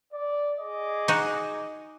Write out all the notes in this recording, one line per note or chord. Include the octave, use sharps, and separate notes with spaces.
D5
G#4 D#5 D6
D#4 F#4